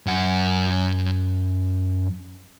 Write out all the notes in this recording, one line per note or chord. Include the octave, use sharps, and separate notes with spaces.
F#2 F#5